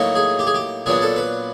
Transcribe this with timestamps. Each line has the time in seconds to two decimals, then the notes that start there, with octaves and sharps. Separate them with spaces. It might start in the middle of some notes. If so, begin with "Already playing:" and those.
Already playing: A2 F#3 A#3 D#4
0.15 G#4
0.39 G4
0.47 G#4
0.54 G4
0.86 A#2 F#3 B3 D4 G#4
1.02 A4
1.16 B4